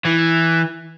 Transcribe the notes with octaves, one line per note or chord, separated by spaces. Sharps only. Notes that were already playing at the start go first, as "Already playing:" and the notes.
E3